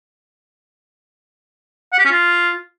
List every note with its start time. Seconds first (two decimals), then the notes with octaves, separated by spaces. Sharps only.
1.93 F#5
1.99 G4
2.05 C#4
2.11 F4